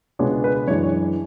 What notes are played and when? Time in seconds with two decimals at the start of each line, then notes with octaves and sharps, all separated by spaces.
0.19 C#2 B2 G#3 B3 D4 C#5
0.44 B4
0.68 F#2 E3 G#3 D4 C#5
0.84 C#5